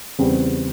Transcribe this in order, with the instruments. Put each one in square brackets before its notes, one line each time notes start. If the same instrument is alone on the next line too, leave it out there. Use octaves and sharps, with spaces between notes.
[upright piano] E2 C#3 G3 C4